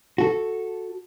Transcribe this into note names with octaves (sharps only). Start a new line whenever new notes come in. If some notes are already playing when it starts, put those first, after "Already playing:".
F#4 A4